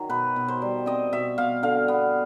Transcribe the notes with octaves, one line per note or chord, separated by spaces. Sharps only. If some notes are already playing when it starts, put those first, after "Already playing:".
Already playing: D#3 F#3
B2 B4
B2
C5
G3
C4 D#5
B2 E5
B2 F5
D3 F5
B3